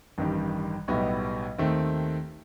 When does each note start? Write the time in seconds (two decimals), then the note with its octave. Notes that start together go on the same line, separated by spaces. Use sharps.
0.18 A1 G2 D#3 G3
0.88 B1 A2 G3 B3 D#4
1.58 D#2 D#3 A3 C4